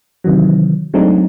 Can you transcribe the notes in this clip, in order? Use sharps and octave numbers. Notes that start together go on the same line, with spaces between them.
C3 D#3 E3 F#3
F#3 G#3 A3 C4 D4 D#4